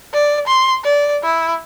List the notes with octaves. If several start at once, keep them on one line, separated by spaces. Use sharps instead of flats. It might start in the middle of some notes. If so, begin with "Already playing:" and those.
D5
C6
D5
E4